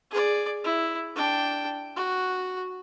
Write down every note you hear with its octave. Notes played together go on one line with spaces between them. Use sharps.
G#4 D5
E4
D4 G5
F#4